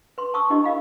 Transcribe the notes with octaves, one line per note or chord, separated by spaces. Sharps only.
B4 C6
A5 C#6 D#6 E6
D4 E4 G4 D#5
A#4 D#5 F5 B5